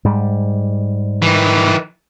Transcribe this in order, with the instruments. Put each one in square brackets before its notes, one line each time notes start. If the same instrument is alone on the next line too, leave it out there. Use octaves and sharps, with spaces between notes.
[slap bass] G#2 G3
[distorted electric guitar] D#3 E3